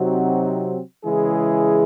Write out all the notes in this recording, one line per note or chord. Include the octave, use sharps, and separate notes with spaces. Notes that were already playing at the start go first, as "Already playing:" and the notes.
Already playing: C3 F#3 C4 D#4 F#4
C#3 E3 G#3 E4 G#4